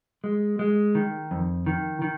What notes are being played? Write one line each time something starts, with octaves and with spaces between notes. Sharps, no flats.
G#3
G#3
D#3
F2
D#3
D#3